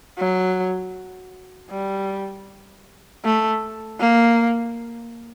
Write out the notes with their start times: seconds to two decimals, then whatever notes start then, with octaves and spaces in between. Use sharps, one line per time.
0.18 F#3
1.71 G3
3.24 A3
4.00 A#3